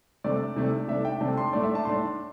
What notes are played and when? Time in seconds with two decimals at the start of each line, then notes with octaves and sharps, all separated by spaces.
0.24 C3 A3 D4 D5
0.56 C3 A3 D4
0.88 C3 A3 D4 E5
1.05 G5
1.20 C3 A3 D4 A5
1.37 C6
1.53 A2 A3 D4 D5
1.63 E5
1.75 A5
1.85 A2 A3 D4 C6